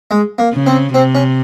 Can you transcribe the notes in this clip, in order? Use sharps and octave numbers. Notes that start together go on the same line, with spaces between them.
G#3
A#3
C#3
C4
C3 C4
C#4